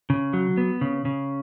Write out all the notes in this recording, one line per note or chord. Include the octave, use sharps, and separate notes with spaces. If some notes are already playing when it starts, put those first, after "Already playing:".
C#3
F#3
B3
C#3
C#3